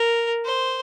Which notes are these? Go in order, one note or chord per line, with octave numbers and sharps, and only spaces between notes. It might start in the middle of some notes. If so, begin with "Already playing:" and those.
Already playing: A#4
C5